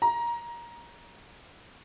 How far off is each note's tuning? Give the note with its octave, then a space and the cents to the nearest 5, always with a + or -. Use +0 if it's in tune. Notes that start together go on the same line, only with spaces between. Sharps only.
A#5 +20